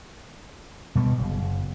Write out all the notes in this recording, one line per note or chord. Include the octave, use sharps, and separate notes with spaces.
B2 G3 A3 B3
F#1